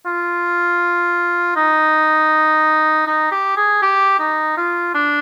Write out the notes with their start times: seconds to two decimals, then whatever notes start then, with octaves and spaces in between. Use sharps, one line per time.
0.06 F4
1.56 D#4
3.07 D#4
3.31 G4
3.57 G#4
3.82 G4
4.19 D#4
4.57 F4
4.94 D4